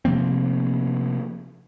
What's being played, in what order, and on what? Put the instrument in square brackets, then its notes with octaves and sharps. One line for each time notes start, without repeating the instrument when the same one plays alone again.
[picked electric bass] C3 F3 A#3 C4